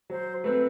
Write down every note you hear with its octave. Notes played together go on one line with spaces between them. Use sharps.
F#3 C5
A3 C4 B4